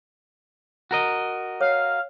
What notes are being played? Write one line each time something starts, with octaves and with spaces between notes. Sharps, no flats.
F#4 A#4 D#5
C#5 F5